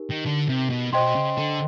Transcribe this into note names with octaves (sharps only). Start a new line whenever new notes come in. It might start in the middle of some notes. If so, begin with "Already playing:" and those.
Already playing: D#4 G4 A#4
D#3
D3
C3
B2
B2 C5 D#5 G5 C6
C#3
D3